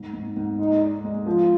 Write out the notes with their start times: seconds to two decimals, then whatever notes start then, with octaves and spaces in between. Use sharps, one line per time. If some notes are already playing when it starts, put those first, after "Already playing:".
Already playing: G#2
0.13 G#2
0.36 G#2
0.58 G#3 D#4
0.82 D5
1.04 G#3
1.26 F3 F4